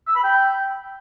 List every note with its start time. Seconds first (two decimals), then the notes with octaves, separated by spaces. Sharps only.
0.07 E6
0.15 B5
0.24 G5